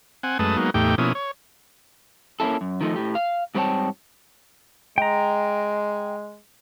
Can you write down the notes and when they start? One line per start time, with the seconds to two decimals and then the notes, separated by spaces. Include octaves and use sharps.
0.23 C4 F#5 G#5
0.39 F#2 G#3 A3 B4 A5 D#6
0.57 F#3 G#3 A#3 B3 D#4
0.74 E2 A2 A3 D#4 G4 G5
0.98 B2 F3 A#3 C#4 E4 D#6
1.15 C#5
2.40 A#3 C#4 D#4 E4 A4
2.61 F#2
2.81 D#3 F3 A3 D#4
2.96 A2 G4
3.15 F5
3.55 G#2 G3 C4 C#5 G5 A5
4.98 G#3 G5 A#5